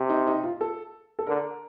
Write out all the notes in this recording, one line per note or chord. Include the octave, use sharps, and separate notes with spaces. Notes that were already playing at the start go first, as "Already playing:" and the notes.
Already playing: C3
D#4
D#4
F4
A4
A4
D3 A#4